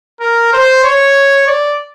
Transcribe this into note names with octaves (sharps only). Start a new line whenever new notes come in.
A#4
C5
C#5
D5